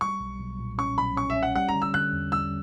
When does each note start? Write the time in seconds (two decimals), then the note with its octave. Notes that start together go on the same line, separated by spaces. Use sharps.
0.01 G3 C#6
0.20 B1
0.40 B1
0.59 A#2
0.78 C#4 C#6
0.98 B1 B5
1.17 C#4 C#6
1.30 E5
1.36 C#4
1.43 F#5
1.56 G3 F#5
1.69 A#5
1.75 D3
1.82 E6
1.94 D3 F#6
2.13 E2
2.32 G3 E6